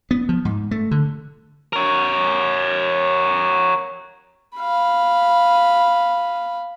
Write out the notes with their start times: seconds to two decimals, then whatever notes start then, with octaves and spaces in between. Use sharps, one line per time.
0.11 B3
0.29 F3
0.45 G#2
0.71 A3
0.91 D3
1.73 A#4 C#5
4.59 F5 B5